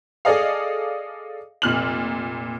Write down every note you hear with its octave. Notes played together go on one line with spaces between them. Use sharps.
G#4 A4 D5 D#5 F5
F1 A#2 F6 F#7